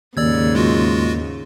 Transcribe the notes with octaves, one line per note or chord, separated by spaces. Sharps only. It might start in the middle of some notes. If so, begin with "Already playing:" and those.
D#2 G#2 C#3 D5 E6 G#6
G#3 F4 F#4